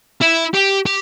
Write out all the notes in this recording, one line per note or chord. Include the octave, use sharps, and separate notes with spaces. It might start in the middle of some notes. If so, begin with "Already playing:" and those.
E4
G4
G4